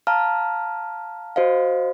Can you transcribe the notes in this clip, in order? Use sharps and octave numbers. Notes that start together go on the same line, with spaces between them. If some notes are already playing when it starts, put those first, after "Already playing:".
F5 A5 A#5 F6
F#4 C5 D#5 F5